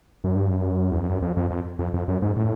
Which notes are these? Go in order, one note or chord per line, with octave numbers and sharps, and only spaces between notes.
F#2
G2
F#2
E2
F2
F#2
F2
F2
F2
F2
F2
F#2
G#2
A2